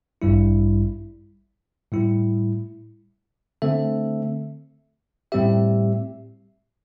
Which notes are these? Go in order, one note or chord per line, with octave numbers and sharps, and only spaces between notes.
A1 G2 G3 E4
A2 G3 E4
D3 A3 C4 A4 E5
A2 G3 C4 G4 E5